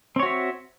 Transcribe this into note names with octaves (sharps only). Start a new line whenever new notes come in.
C4 F#4 C#5 E5